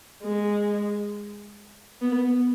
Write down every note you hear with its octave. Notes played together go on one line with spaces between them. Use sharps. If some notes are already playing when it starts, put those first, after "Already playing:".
G#3
B3